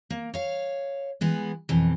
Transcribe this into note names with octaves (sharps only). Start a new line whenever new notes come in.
A#3
C#5 F5
E3 G#3 B3
F2 B2 E3